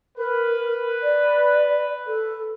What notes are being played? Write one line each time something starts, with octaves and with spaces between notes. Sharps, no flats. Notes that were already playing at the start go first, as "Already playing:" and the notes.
A#4 B4
D5
A4